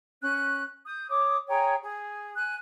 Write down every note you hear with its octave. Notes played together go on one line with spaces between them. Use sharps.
C#4 F#6
D#6 G6
C#5 D6 D#6
G#4 C#5 G5 A#5
G#4
G#5 F#6